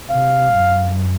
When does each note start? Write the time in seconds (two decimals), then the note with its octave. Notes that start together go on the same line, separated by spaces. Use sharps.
0.09 C3 F5
0.51 F#2